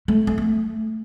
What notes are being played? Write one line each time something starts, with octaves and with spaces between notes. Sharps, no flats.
A3
A3
A3